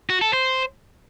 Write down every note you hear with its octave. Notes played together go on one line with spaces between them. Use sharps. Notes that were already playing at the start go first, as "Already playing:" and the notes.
F#4
A4
C5